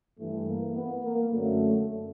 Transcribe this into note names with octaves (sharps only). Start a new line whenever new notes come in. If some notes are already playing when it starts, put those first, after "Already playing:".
G2 E3 A3
A#3
B3
A#3
F#2 D3 F#3 A3